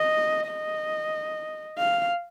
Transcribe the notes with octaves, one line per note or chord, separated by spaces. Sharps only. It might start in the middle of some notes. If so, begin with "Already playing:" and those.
Already playing: D#5
D#5
F5